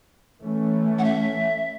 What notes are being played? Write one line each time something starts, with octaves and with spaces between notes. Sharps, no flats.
E3 A3 C#4
F#5
E5